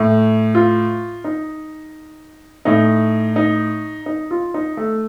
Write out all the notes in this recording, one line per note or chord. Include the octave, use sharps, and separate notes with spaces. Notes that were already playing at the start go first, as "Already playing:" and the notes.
Already playing: A2
F4
D#4
A2 D#4
D#4
D#4
F4
D#4
A3